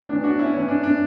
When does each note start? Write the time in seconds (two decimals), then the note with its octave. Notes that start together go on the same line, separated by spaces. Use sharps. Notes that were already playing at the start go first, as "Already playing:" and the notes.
0.09 A2 E3 D4
0.24 D4 F#4
0.38 C#4 E4
0.53 A2 C#4
0.56 E3
0.68 D4
0.83 D4